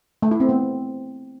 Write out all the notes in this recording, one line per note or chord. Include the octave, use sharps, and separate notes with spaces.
A3
E4
C4
B3